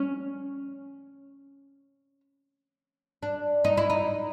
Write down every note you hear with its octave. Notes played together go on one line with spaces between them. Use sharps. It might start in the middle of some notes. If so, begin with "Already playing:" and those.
Already playing: C#4
D4
D#4
E4
D#4